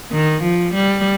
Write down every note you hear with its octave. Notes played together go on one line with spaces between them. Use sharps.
D#3
F3
G3